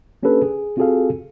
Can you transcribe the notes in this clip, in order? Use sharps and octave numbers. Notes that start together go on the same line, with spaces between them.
A#3 C#4 D4 G4 A4 B4
G#4
C4 F4 F#4 G#4 A4 F5